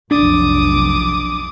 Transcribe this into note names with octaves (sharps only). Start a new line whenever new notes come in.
F1 B1 D4 D6 D#6